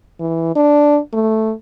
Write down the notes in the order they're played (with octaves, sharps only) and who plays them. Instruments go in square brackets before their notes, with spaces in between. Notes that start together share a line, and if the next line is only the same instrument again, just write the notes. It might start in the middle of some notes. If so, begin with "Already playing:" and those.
[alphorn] E3
D4
A3